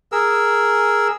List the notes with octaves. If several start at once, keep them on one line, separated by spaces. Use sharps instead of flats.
G#4 A#4 E6